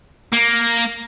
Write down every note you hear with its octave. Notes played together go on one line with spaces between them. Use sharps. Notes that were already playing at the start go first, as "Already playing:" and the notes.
A#3